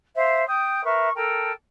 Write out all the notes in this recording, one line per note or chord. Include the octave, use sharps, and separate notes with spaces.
C5 E5 F5
G5 D#6 G6
A#4 B4 E5 C#6
A4 A#4 G5 A5